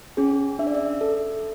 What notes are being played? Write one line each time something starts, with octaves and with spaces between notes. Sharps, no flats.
C#4 G#4
D4 E5
D5
E5
A4